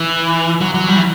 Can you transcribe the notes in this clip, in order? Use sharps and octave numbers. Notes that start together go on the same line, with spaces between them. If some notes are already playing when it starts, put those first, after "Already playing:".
Already playing: E3
F#3
F#3
G3
E3